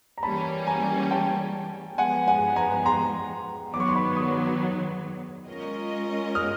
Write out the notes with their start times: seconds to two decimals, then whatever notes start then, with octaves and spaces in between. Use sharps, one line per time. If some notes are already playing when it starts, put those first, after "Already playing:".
0.18 A#5
0.23 E3 G3 A#3 C#4 A5 B5
0.67 G#5 A#5
1.11 G5 A5
1.98 F3 G#3 B3 F#5 G#5
2.28 F#5 G#5
2.56 G#5 A#5
2.85 A#5 C6
3.73 D#3 F#3 B3 D6
3.80 C#6
3.89 C6
3.96 B5 C#6
4.16 C#6 D#6
5.48 G#3 C#4 F4 A#4 D#5
6.35 D#6 F6